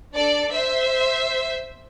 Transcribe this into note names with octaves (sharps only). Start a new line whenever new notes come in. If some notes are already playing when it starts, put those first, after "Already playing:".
D4 A4 D5
C5 E5